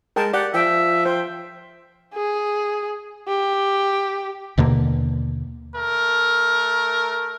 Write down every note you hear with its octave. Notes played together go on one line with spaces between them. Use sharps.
G#3 A#4 G5 A5
G4 D5 F#5
F3 E5 G5
C5 G5
G#4
G4
D#2 B2 D3 A#3
A3 A#4